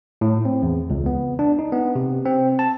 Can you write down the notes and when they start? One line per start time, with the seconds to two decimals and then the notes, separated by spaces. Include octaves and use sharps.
0.21 A2
0.45 C4
0.63 E2
0.90 C#2
1.06 B3
1.39 D4
1.59 D#4
1.72 B3
1.95 C3
2.26 C4
2.59 A5